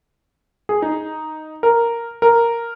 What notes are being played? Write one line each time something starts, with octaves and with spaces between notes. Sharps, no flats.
G#4
D#4
A#4
A#4